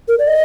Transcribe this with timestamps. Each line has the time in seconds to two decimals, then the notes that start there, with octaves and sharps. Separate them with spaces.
0.08 A#4
0.19 D5
0.28 D#5